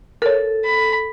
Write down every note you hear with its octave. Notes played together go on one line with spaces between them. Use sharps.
A4 A#4 C#5
B5